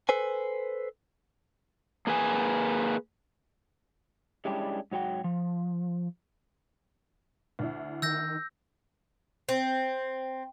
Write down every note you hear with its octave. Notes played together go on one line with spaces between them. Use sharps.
A4 B4 C5 G#5
A#3 G#4 B4 G#5
G3 G#3 C#4 D4 E4 G4
G#2 F#3 F#4 G5
F3
D2 D4 E4
D#3 E6 G6 A#6
C4